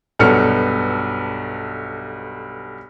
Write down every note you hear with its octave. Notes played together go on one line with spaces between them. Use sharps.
B1 G2 B3 A4 F6 C#7